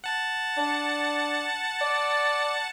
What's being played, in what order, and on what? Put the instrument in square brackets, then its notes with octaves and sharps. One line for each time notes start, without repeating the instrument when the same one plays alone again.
[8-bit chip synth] F#5 A5
[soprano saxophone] D4
D5